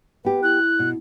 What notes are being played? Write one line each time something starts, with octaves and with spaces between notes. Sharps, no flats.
B3 G4 B4
E4 F#6
B2